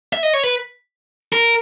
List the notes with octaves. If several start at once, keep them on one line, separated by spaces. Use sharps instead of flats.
E5
D#5
C#5
B4
A#4